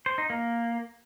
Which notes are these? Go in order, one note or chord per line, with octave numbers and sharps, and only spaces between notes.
C5
D#4
A#3